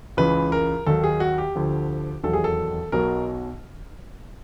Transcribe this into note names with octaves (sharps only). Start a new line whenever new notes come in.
C#2 C#3 E3 B4
A#4
D#2 D#3 F#3 A4
G#4
F#4
G4
D2 D3 F3
E1 D#2 D#3 F#3 A4
G#4
A4
B1 B2 F#3 A#4